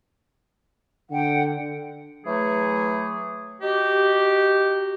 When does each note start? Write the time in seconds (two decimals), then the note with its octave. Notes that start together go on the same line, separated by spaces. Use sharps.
1.10 D3 F#5 G5
2.25 E3 F#3 A3 G#4
3.62 D#4 F#4 G4